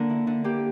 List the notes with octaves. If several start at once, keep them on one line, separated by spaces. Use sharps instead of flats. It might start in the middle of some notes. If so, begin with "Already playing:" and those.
Already playing: D3 A#3 A#4
E4
D3
A#3 G4